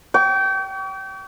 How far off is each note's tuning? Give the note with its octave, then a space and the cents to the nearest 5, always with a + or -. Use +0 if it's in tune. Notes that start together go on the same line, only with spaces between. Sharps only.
G5 -25 C#6 +45